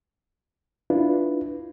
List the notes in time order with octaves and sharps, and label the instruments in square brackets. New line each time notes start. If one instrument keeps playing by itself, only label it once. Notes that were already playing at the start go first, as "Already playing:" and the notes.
[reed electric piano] D4 E4 F4 B4